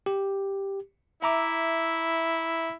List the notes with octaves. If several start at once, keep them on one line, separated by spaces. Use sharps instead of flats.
G4
E4 E5 A#5 D6